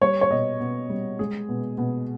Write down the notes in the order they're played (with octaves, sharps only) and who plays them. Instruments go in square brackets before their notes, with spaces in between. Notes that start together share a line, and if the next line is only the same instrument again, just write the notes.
[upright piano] G3 C#5
C#5
B2 D#5
B2
G3
G#3 G#4
B2
B2